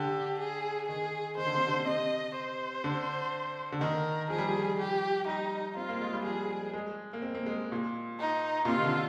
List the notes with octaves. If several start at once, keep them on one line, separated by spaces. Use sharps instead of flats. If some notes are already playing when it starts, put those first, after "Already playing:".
Already playing: D3 G4
G#4
D#3 G#4
D#3 C5
D3
C3
D3
C3 D#5
C5
D3
D3
D#3 A#4
F3 G#4
G3
F3
G4
G3 D#4
C4 F4
A#3
G#3
G3
F3 G#4
G#3
A#3
C4
A#3
G#3
A#2
D#4
A#2
C3 F4
D#3
D3